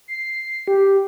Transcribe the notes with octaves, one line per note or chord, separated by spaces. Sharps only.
C7
G4